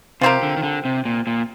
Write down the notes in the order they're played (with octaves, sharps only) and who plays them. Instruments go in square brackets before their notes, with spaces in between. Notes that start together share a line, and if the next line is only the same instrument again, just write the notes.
[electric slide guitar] C3 [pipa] F3 C4 G4 A#4
[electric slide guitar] D3
D#3
D3
C3
A#2
A#2